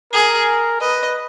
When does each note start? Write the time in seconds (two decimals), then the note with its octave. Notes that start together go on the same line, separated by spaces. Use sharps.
0.13 G#4 A#4
0.81 B4 D#5